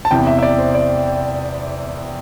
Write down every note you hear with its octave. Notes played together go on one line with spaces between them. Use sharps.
A5
E2 C3 E3 G5
E5
E5
D5
C5
D5